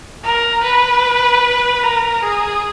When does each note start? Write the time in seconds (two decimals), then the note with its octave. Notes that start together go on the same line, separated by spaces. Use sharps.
0.24 A#4
0.64 B4
1.83 A#4
2.23 G#4